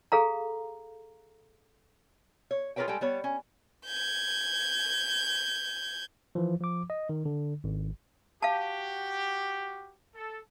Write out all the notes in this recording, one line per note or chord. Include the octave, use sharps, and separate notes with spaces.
G#4 A4 F5 A#5
C#5
F4 G#4 A#4 B4 C#5 G5
G3 G#3 A4 G5
G3 B3 C#5
C#4
G6 G#6
E3 F3
F3 D6
D#5
D#3
D3
G#1
F#4 G4 F5 A5
A4